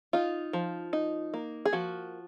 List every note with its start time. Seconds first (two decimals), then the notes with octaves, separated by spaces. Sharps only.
0.13 D#4 F4
0.53 F3
0.93 D#4
1.34 A#3
1.65 G#4
1.73 F3 F#4